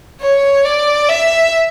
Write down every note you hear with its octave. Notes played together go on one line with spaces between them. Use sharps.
C#5
D5
E5